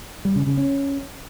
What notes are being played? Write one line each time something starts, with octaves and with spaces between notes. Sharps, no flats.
G3
C#3
C#3
C#4